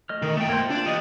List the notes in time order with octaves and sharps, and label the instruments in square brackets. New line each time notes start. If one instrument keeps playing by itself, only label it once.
[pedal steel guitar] A3 D#5 F6
[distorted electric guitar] D#3
A3 G5
[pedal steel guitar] A#3 C5
[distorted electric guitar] D4 D5 [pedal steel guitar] F4 C5
[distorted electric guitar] G4 D#5